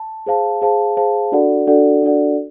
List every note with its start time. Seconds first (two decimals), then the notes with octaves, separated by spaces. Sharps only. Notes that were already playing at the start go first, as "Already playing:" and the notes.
Already playing: A5
0.26 G#4 C5 F5 A5
0.62 G#4 C5 F5 A5
0.97 G#4 C5 F5 A5
1.32 D4 F#4 A4 D5 F#5
1.67 D4 F#4 A4 D5 F#5
2.03 D4 F#4 A4 D5 F#5